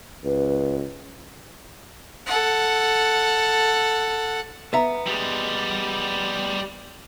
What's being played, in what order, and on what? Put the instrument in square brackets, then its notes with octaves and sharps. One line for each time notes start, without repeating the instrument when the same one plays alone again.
[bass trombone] C#2 [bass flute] B4
[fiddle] A4 F#5
[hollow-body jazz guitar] B3 E5 A#5
[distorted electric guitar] G3 G#3